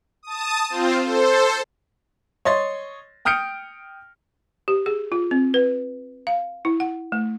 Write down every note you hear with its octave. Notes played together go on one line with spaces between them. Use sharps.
A5 D#6
C4 F4 C5
A4 C5
C#5 D#5 C6 A6
G5 D#6 F6 G6 C#7 D7
G4
G#4
F4
C4
B4
F5
E4
F#5
A3